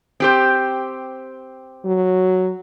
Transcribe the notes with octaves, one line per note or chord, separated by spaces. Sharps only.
C4 G4 C5
F#3